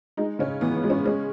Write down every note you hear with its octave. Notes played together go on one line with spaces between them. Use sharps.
G#3 D#4
C#3 C#4
E3 B3
B3
G#3
C#4
G#3 C#4